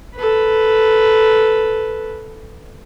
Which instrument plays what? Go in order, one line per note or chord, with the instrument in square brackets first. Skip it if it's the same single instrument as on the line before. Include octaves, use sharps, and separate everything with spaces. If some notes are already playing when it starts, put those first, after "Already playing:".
[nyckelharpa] A4 B4